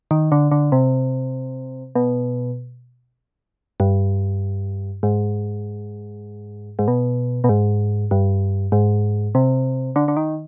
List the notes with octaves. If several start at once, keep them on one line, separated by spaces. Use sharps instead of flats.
D#3
D3
D3
C3
B2
G2
G#2
G#2
B2
B2
G#2
G2
G#2
C3
D3
D3
D#3